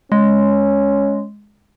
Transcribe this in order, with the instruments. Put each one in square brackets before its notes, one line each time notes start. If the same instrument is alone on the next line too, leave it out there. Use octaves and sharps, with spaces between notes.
[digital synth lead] G#3 [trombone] C#4